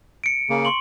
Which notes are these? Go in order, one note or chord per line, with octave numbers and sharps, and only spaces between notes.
C#7 D7
C#3 A#3
C6 C#6 F#7